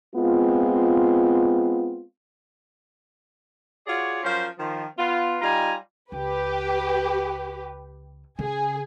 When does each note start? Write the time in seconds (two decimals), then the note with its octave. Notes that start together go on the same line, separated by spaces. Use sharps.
0.16 G#3 B3 C4 F4
3.87 F4 F#4 G#4 C#5 D5
4.24 F3 F#3 C#4 A#4 C5
4.59 D#3 F3
4.98 B3 F4
5.41 G3 D#4 F4 G#5 A#5
6.12 C#2 G4 B4
8.39 C#3 G#4